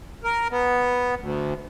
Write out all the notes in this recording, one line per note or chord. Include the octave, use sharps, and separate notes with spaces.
A#4
B3
D2